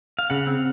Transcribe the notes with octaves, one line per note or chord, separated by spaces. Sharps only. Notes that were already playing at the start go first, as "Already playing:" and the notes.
F5
C#3 F#5
C4